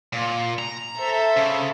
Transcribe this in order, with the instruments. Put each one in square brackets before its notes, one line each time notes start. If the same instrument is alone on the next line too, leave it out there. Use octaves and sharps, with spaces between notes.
[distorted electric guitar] A#2
A#5
[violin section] A4 C5 E5
[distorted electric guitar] C#3